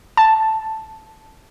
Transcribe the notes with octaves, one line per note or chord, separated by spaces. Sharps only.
A5